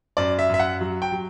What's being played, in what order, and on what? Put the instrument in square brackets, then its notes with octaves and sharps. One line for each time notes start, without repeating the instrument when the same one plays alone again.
[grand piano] F#2 D5
E5
F#2 E5
F#5
F#3
G5
F#3